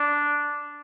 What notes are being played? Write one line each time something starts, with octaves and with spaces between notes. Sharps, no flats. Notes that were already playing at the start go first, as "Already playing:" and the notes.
Already playing: D4